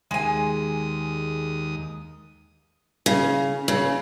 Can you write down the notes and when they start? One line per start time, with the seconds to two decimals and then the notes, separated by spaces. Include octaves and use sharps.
0.11 D#2 G#3 G#5 D#6
3.06 C#3
3.68 C#3